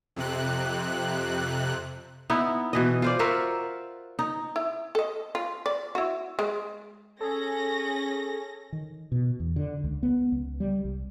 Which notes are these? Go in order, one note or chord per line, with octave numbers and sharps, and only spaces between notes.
F2 C3 F#6
B3 D#4 E4
B2 E3 D#5
F4 C5 D5
F4 F#4 A#4 E5
D#4
E4
A4 D#5
F4
D5
E4 F#4
G#3
C#4 G#4 A4 A#6
D#3
B2
E2
D3
C#2
B3
C#2
G3
C2